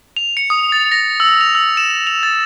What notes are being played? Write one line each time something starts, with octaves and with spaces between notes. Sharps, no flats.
F7
C#7
D#6
A6
A#6
E6
F7
E6
E7
F7
A6